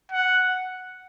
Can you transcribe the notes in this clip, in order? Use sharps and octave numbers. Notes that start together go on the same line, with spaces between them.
F#5